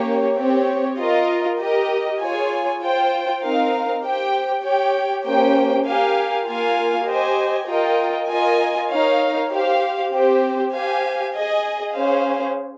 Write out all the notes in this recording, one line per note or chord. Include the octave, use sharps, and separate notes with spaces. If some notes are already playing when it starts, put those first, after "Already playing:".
Already playing: A#3 C#4 G4 C#5
C4 G4 C#5
F4 A#4 D#5
G4 A#4 D#5
F4 G#4 C#5 G#5
F4 C5 G5
C4 D#4 A#4 F5
G4 C5 G5
G4 C#5 G5
A#3 C#4 G4 C5 G5
G4 A#4 F5 G#5
A#3 F4 A#4 F5 G#5
G4 C5 D#5 G#5
F4 A#4 D#5 G5
F4 A#4 D#5 G#5
D#4 A#4 C#5 F5
G4 C5 F5
C4 G4 C5
G4 C5 F5 G#5
G#4 D#5 G#5
C#4 G#4 C5 F5